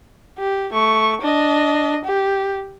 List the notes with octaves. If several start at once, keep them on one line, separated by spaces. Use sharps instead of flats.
G4
A3 C#6
D4 D#5
G4